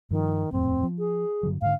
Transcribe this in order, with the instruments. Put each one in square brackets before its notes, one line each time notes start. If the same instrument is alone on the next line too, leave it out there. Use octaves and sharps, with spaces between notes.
[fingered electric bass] G2 F3 [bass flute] D#3
[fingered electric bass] D#1 F2 A2 [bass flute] C4
[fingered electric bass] F3
[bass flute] G#4
[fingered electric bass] G2 D3 F#3
[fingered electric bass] G#2 D3 [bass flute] F5